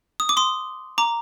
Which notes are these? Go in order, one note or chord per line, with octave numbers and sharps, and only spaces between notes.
D#6
D6
C6 D#6
A#5 D6